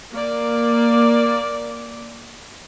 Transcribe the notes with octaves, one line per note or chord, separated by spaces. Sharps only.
A#3 D5